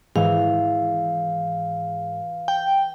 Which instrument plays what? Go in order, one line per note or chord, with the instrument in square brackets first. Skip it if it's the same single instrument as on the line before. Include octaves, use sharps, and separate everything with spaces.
[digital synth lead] G#2 [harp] E3 [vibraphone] F5
[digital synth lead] G5